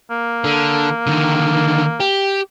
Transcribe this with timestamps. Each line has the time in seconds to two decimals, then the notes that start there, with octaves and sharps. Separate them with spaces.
0.11 A#3
0.44 D3
1.07 D3 D#3
2.00 G4